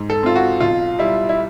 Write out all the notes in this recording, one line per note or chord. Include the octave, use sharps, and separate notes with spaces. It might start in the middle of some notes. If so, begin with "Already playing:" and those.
Already playing: G#2
A4
C4 F4
F#4
B1 F4
G3 E4
E4